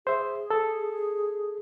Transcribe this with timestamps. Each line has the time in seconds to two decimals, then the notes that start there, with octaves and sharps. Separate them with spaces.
0.07 G#4 C5 E5
0.50 A4